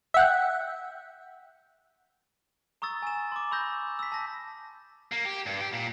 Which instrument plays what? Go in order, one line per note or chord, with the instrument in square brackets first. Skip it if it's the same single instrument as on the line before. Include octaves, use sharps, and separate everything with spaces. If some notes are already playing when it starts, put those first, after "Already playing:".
[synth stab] E5 F#5 G5
[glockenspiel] A#5 C#6 D#6 E6 A6
G#5 E7
C6 D6
B5 C#6 E6 G6 A#6
E6 B6
A5 A#6
[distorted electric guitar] A#3
G4
G2
G4
A#2